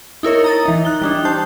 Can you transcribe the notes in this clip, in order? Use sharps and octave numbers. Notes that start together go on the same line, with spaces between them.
D#4 E4 A#4 C#5
A#5 D#6 A6
E3 D#4
F#6 G7
G3 D4 D#4
C5 A5 G6